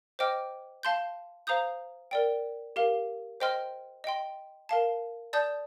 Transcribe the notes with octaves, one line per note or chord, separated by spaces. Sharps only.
C5 D#5 G5 D6 F6
F5 A5 C6 G6
C5 F5 A#5 D#6 G6
A#4 D5 G5
G4 A#4 F5
C5 D#5 G5 C6 F6
D#5 G5 C6
A#4 F5 A5
D5 A5 D#6 G6